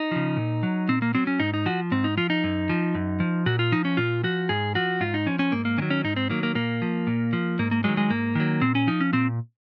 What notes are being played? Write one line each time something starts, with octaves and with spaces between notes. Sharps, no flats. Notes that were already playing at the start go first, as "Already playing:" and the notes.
Already playing: D#4
C#3 F3
A#2
F#3
A#2 C4
A#3
F#3 C4
C#4
G#2 D#4
D#4
F3 F#4
G#2 C4
D#4
F3 F4
D#4
F#2
F3
F#2
F3
A#2 F#4
F4
F3 D#4
C#4
A#2 F4
F3 F#4
G#2 G#4
F3 F#4
G#2 F4
D#4
F3 C#4
C#4
G#2 A#3
A#3
D#3 F#3 C#4
C#4
G#2 D#4
C4
D#3 F#3 A#3
A#3
A#2 A#3
F3
A#2
F3
G#2 A#3
A#3
D#3 F#3 G#3
G#3
G#2 A#3
D#3 F#3
A#2 C4
C#4
F3 D#4
C#4
A#2 C4